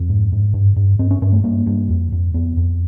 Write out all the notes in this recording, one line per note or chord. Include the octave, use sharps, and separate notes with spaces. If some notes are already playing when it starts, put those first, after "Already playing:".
Already playing: F2 C4
G#2
G#2
G2
G2
G2 C4
C#4
G2 C#4
A3
G2 A#3
G2
F2
F2
F2 B3
F2